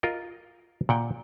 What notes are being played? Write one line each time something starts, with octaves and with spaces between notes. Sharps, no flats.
F4 A#4 D#5
A#2 F#5 G5